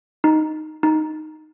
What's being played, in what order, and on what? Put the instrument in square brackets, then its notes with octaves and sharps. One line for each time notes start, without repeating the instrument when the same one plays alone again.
[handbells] D#4
D#4